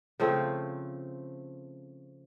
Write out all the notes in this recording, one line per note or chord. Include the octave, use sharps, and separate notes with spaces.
C#3 F3 A3 C4